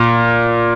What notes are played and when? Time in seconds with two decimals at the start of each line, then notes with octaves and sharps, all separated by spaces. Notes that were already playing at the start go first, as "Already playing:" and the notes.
Already playing: A#2